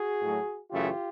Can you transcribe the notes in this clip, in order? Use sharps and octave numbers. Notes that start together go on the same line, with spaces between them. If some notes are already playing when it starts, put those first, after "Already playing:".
Already playing: F#4 G#4
A2 F#3 A3
F#2 C#3 E3 A3 F4 G4